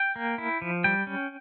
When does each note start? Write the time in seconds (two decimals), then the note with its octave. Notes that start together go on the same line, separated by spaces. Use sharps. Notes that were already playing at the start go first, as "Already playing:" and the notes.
Already playing: G5
0.16 A#3
0.38 E4
0.62 F3
0.84 G3 G5
1.07 C#4